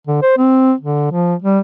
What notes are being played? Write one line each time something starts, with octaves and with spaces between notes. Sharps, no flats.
D3
C5
C4
D3
F3
G3